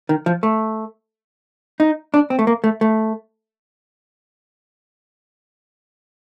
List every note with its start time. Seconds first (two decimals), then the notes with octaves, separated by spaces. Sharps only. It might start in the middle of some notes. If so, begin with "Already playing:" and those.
0.09 D#3
0.26 F3
0.43 A3
1.80 D#4
2.14 D4
2.30 C4
2.39 A3
2.47 A#3
2.64 A3
2.81 A3